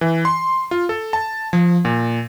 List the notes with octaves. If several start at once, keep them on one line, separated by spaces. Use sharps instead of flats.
E3
C6
F4
A4
A5
F3
A#2